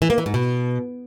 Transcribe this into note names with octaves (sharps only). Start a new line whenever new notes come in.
E3
A#3
E3
G#2
B2